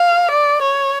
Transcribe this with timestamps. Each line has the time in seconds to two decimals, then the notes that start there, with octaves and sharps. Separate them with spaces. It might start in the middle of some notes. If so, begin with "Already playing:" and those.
Already playing: F5
0.31 D5
0.62 C#5